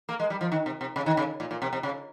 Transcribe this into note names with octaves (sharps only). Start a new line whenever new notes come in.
A#3
G#3
G3
F3
D#3
C3
C3
C#3
D#3
C#3
A#2
A#2
C3
C3
C#3